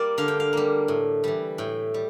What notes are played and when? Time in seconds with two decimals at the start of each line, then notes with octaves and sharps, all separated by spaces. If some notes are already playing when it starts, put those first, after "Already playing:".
Already playing: G3 A#3 D5
0.18 D3 F5
0.28 G5
0.40 F5
0.53 G3 A#3
0.88 A2
1.24 E3 G3
1.58 A2 G5
1.94 G3